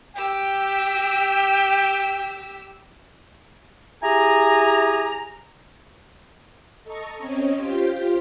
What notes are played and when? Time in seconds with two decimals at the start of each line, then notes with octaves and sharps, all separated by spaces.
0.16 G4 G5 E6
4.03 E4 G4 G#4 G#5 A#5
6.84 A4 D#5 A#5 C#6
7.18 C4 C#4 C#5 D#5
7.54 F4 G4 C5